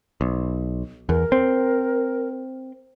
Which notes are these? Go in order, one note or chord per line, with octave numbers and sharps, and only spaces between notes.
B1
E2 A#4
C4